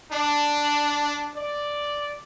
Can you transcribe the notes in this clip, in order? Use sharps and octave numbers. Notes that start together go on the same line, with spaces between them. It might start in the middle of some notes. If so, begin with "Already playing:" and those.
D4
D5